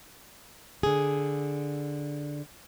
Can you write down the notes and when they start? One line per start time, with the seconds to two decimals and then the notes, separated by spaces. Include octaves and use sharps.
0.83 D3 G#4